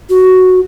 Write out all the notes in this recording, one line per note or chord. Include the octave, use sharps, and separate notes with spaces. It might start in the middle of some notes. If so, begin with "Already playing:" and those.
F#4